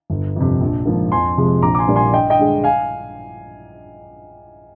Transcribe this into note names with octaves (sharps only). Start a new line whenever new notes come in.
G1
F2 C3
A#1
G#2 F3 A#3
F2 G#5 C6
C3 F3 G#3 C4
A#1 A#5 D6
D6
G#5 C6
A#2 G3 A#3
G#5 C6
G2 D#5 G5
D#5 G5
D3 G#3
F5 G#5